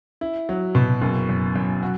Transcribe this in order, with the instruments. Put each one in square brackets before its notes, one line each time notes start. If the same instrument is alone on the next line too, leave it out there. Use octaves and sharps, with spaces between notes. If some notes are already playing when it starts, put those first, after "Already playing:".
[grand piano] E4
F#3
B2
F#1
F#2
F#2
F#4